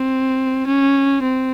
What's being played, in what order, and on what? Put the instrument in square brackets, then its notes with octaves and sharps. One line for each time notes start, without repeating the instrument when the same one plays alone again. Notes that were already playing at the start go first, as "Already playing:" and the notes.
Already playing: [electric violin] C4
C#4
C4